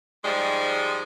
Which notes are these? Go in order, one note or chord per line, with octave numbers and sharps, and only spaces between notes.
G#2 F3 G3 G#3